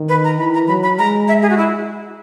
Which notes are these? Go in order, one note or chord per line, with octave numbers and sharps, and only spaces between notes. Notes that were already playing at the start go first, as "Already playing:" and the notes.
Already playing: D#3
B4
A#5
E3 B5
A#5
F#3 B5
B5
G#3 A#5
E5
G#4
F#4
E4